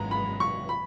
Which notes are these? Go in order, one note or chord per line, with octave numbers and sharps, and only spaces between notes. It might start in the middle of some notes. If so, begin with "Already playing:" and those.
Already playing: G#1 F#2 E3 G#3 B3 A#5
B5
C#6
B5